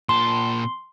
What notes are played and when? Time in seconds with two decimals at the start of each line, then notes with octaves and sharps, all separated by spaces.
0.09 A#2 A5 C6